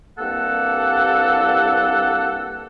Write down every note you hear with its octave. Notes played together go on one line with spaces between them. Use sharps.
C2 G2 A#3 A4 F#5